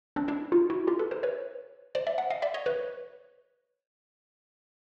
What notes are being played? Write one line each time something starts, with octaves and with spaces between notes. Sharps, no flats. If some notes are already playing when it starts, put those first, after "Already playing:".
C4 D4
D4 E4
D#4 F4
E4 F#4
F4 G4
A4 B4
A#4 C5
B4 C#5
C5 D5
D5 E5
E5 F#5
D#5 F5
D5 E5
C#5 D#5
B4 C#5